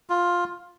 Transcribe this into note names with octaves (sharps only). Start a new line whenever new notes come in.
F4